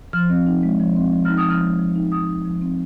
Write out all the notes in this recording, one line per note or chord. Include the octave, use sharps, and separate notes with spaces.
F3 F6
C4
D#4
G#3
F3
C4
F3
D#4 F6
D#6
F3 F6
G#3
F3
D#4
F3 D#6
D#4
F3
C4